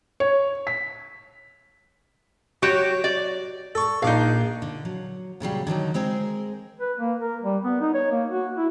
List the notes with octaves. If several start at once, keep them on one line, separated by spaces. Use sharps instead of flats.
C#5
B6
F#3 F#4 G4 C#5
D5
A4 C#6
A#1 D4 D#4 F5
D3
F#3
A#2 C#3 F#3 G3
D3 D#3 F#3 D#4
G#3 C4 G#4 A#4
B4
A#3
A#4
G3
B3
D#4
C#5
A#3
F#4
E4